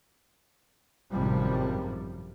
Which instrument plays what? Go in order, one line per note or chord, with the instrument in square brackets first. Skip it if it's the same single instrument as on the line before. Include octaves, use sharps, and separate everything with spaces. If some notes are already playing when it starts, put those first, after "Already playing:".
[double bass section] G#1 F#2 A2 C3 F3 G3